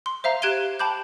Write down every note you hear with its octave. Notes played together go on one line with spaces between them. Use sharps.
C6
C5 E5 F5 A#5
G4 F#6 G#6 D7 D#7 G7
G5 A5 B5 D6 G6